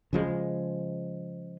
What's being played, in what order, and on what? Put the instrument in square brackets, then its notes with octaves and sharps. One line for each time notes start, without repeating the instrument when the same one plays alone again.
[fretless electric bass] C#3 F3 G#3